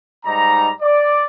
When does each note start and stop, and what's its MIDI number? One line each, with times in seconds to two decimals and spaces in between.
0.25 0.70 44
0.25 0.70 55
0.25 0.70 63
0.25 0.70 82
0.81 1.27 74